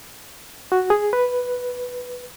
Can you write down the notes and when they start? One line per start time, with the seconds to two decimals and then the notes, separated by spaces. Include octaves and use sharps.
0.72 F#4
0.90 G#4
1.13 B4